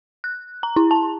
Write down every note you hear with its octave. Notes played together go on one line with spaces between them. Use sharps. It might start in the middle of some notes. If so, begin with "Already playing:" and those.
F#6
A#5
E4
A5